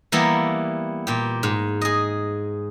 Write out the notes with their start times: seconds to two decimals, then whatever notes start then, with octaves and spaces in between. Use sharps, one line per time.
0.12 E3 G3 A#3 B3 E4
1.07 A#2 G4
1.43 G#2
1.81 G#4 D#5